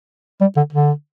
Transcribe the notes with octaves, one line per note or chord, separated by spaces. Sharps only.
G3
D3
D3